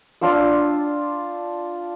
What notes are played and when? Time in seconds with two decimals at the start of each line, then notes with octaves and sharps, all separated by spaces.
0.21 D4 F4 G5 E6